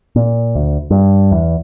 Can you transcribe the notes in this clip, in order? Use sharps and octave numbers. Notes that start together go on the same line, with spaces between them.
A#2
D2
G2
E2